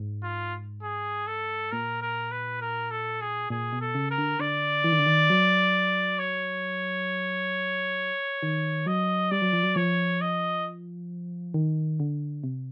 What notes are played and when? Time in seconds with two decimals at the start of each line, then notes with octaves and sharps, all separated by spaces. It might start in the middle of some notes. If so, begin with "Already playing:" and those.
Already playing: G#2
0.23 F4
0.82 G#4
1.27 A4
1.72 A#2 A#4
2.02 A#4
2.31 B4
2.61 A#4
2.91 A4
3.21 G#4
3.50 A#2 G#4
3.73 B2
3.81 A4
3.95 C#3
4.11 A#4
4.18 D3
4.39 D3 D5
4.84 E3
4.92 D#3
4.99 D3
5.06 D#3
5.30 F#3
6.19 C#5
8.43 D#3
8.86 F#3 D#5
9.31 G3 D5
9.42 F#3
9.53 F3
9.63 F#3
9.76 F3 C#5
10.21 D#5
11.54 D#3
12.00 D3
12.44 C3